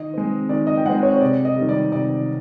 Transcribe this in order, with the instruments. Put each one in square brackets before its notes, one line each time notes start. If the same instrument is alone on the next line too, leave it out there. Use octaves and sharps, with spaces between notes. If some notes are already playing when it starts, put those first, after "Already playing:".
Already playing: [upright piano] D#3 D#5
G#3 C4
D#3 D5
D#5
G5
G#3 C4 F#5
C#5
C#5
C3 D5
D#5
D#3 G3
D5
C3 D5